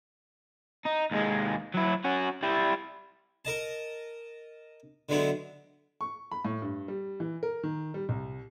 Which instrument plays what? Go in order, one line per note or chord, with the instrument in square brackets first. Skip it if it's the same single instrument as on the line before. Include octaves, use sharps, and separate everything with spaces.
[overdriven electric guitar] D#4
D#2 G#3
F#3 E4
C#4 F#4
G3 E4
[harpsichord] A#4 D#5 A5
D3 F#3 G#3 B3 E4
[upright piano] C#6
B5
A2
G2
G3
E3
A#4
D#3
G3
C2